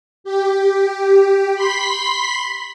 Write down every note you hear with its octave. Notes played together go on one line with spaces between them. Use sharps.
G4
B5 C6 B6